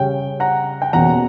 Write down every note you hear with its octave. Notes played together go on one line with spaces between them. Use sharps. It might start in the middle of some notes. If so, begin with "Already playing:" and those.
Already playing: C#3 G3 C#4 G5
F#5 A#5
G5
E2 B2 A#3 C#4 F#5 A#5